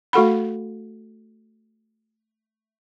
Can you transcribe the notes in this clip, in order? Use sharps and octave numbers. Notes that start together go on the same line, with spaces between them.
A3 F#4 A4 F#5 B5